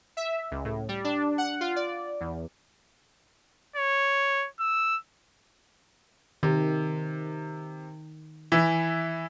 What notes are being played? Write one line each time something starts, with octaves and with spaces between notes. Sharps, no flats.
E5
C#2
A2
G3
D4
F#5
F4
D5
E2
C#5
E6
C3 D#3
E3 E4